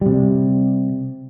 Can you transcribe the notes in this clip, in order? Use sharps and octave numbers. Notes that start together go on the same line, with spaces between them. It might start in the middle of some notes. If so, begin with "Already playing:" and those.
C3 G3